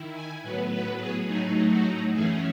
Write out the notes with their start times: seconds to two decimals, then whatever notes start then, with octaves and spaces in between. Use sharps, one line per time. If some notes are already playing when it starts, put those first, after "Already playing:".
Already playing: D#3 E4
0.14 G#5
0.42 A2 F#3 B3 B4
0.71 B4
1.00 G#4
1.27 A2 F#3 A3 D#4 G#4
1.71 F#4
2.12 F#2 E3 A3 C#4 G#4